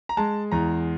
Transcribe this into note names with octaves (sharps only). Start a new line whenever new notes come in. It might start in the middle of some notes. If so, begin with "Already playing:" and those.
A#5
G#3 A5
E2 A#5